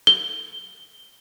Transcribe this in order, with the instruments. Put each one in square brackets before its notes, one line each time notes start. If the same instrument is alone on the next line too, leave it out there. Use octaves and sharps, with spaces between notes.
[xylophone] G7